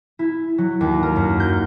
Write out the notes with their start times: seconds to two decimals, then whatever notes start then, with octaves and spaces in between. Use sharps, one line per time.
0.19 E4
0.58 F#3
0.81 D#2
1.03 A#4
1.16 F#2
1.40 G6